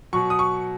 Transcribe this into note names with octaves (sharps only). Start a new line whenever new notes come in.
B2 F#3 C#6
D#6
C#6